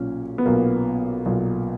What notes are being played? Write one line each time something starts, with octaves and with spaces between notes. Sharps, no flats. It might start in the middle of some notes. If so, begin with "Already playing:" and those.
Already playing: B1 A#2 C#4
B3
B1 A#2 A#3
B1 A#2